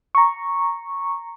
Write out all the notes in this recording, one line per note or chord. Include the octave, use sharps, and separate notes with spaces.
A#5 C#6